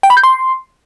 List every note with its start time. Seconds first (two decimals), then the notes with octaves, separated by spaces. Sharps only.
0.03 G5
0.10 B5
0.17 G6
0.23 C6